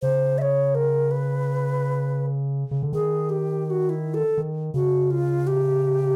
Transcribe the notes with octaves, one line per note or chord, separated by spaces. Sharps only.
C#3 C5
E5
C#5
A#4
B4
C#3
D3
D#3 G#4
G4
G4
F#4
E4
A4
D#3
C#3 F#4
F4
G4